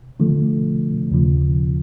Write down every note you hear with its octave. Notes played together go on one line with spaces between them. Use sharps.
D3 F3 A3
D#2 C#3 F3